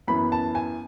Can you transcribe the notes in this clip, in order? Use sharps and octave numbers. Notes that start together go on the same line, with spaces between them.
F#2 E3 B3 B5
A5
G#5